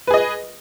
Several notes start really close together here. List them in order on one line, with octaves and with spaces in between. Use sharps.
B4 G#4 D#5